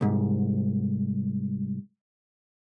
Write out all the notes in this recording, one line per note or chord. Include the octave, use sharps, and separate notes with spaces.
C2 G#2